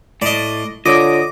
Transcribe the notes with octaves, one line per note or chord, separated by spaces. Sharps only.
A2 D5 D#5
D3 F4 C#5 D#5 D6 D#6